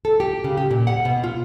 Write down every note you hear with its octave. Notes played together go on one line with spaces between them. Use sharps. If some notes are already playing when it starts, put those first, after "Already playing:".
A4
G4
C#3
G4
A#2
F#5
B2
F4